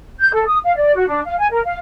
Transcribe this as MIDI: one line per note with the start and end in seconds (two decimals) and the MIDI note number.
0.20 0.30 91
0.33 0.46 69
0.46 0.58 87
0.64 0.74 77
0.76 0.95 74
0.95 1.06 66
1.07 1.20 62
1.25 1.37 77
1.38 1.50 80
1.50 1.61 70
1.65 1.78 77